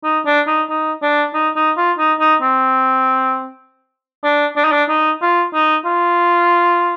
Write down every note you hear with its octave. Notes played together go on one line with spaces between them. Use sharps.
D#4
D4
D#4
D#4
D4
D#4
D#4
F4
D#4
D#4
C4
D4
D4
D#4
D4
D#4
F4
D#4
F4